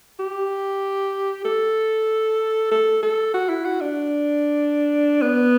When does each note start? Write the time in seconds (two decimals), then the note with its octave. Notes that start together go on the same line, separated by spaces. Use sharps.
0.20 G4
1.45 A4
2.71 A4
3.03 A4
3.34 F#4
3.49 E4
3.65 F#4
3.81 D4
5.22 B3